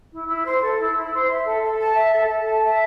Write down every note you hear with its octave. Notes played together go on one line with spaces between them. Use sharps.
E4
E4
C5
A4
E4
E4
C5
E5
A4
A4
A5
E5
A4
A4
A5
E5